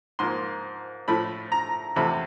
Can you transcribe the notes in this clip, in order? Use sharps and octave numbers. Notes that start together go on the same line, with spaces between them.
G#2 F3 A#3 C6
A2 F3 A3 B5
A#5
E2 C3 F3 A3 B5